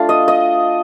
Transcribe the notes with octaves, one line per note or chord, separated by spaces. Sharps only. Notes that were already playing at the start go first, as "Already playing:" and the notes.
Already playing: A3 D4 F4
D#5
D#5